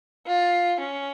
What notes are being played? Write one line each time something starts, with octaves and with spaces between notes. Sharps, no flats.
F4
C#4